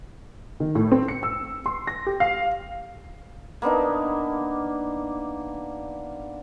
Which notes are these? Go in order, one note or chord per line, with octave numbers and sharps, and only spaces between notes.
D#3
A2
C4
C#7
E6
C6
A#6
G4
F5
A#3 B3 D4 D#4